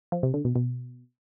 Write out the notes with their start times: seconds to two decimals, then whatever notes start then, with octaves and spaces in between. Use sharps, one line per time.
0.12 F3
0.23 C3
0.34 D3
0.45 B2
0.56 B2